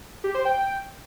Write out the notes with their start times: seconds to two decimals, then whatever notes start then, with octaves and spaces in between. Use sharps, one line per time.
0.24 G4
0.35 C5
0.45 G5